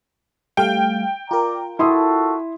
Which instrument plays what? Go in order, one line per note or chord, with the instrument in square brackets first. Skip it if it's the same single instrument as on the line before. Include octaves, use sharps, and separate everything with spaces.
[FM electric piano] G3 A3 F5 [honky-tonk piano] G5
[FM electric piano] F4 A#4 [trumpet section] D5 A#5
[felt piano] E4 C6 D#6 [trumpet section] F#4 A4